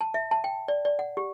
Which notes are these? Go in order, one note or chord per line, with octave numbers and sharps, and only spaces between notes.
A5
E5
A5
G5
D5
D5
F#5
G4